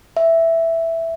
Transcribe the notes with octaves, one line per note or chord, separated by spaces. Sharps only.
E5